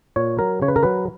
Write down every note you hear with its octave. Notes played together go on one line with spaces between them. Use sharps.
A#2 C#5
F#3 A#4
C#3 C#5
B4
A#4
F#3 B4